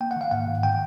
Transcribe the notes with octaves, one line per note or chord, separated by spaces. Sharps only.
A#3 G5
F#5
D#3 F5
G#2 F#5
G#2
D#3 G5